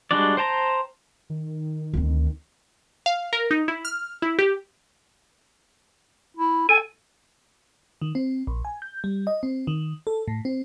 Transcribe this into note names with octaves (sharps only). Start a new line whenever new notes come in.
G3 G#3 D4 F#4 D5
C5 G5 A5 A#5 C6
D#3
D2 C4
F5
A#4
D#4
E4
F6
E4
G4
E4
A4 G#5
D#3
C4
A#1
G#5
G6
G3
D#5
C4
D#3
A4
A2
C4